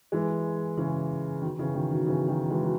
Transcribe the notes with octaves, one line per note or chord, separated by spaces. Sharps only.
E3 G#3
C#3 E3
B2 D#3
C#3 E3
B2 D#3
B2 D#3
C#3 E3
D#3 F#3
E3 G#3
F#3